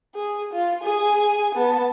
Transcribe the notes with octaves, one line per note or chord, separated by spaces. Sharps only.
G#4
F4
G#4 G#5
B3 A5